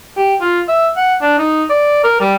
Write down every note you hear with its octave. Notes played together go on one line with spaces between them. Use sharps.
G4
F4
E5
F#5
D4
D#4
D5
A#4
G3